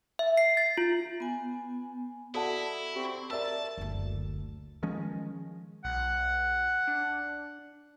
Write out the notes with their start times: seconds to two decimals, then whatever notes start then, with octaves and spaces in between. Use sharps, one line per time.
0.19 E5
0.37 C7
0.57 A6
0.77 F4
1.20 B3 G#5
2.34 E4 F#4 A4 D5 F#5 A5
2.96 C4 G4 C#6
3.30 A#4 D5 E5 A5 E6
3.77 F#1 D2
4.83 D#3 F3 G#3 C#4
5.85 B1 F#5
6.87 D4